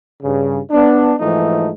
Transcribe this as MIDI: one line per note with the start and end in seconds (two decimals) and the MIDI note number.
0.22 0.58 43
0.22 0.58 49
0.71 1.14 59
0.71 1.14 62
1.20 1.69 44
1.20 1.69 52
1.20 1.69 53
1.20 1.69 57
1.20 1.69 63